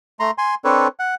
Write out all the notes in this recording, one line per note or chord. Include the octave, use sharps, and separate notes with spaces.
A3 A#5 C6
G#5 C6
C4 D4 A4 B4 C#5
F#5